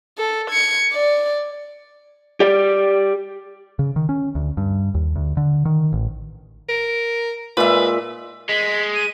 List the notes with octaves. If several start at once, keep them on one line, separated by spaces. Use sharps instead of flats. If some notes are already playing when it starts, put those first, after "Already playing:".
A4
G#6 C#7
D5
G4 D5
C#3
D#3
C#4
D2
G2
D#2
D2
D3
D#3
A1
A#4
A#2 G#3 B4 E5
G#3 B6
D#7